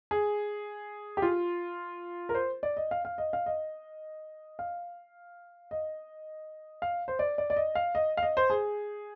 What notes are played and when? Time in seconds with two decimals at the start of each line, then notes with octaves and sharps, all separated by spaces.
0.11 G#4
1.17 G4
1.22 F4
2.29 A#4
2.35 C5
2.63 D5
2.77 D#5
2.91 F5
3.05 F5
3.18 D#5
3.33 F5
3.46 D#5
4.59 F5
5.71 D#5
6.82 F5
7.08 C5
7.19 D5
7.38 D5
7.50 D5
7.56 D#5
7.75 F5
7.95 D#5
8.17 F5
8.23 D#5
8.37 C5
8.50 G#4